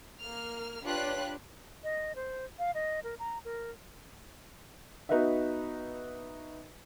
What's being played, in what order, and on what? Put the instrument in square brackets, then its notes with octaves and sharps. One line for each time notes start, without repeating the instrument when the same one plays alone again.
[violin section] A#3 F6
D4 F4 G4 B4 C#5 F#6
[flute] D#5
C5
F5
D#5
A#4
A#5
A#4
[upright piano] B3 D#4 F#4 B4 D#5 E5